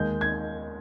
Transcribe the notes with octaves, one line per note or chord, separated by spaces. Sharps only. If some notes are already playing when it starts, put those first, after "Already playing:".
Already playing: D#2 D#3 G#3 G6
G#6